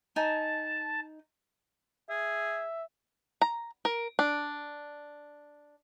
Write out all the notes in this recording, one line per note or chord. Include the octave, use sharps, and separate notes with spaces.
D#4 G#5 A5
G#4 E5
A#5
A#4
D4